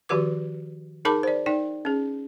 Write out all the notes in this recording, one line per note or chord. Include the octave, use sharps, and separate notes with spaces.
D#3 F3 F#4 G4 B4 D6
D#4 G#4 A#4 A5 B5 D6
C5 D5
D#4 D5 G5
C#4 G#4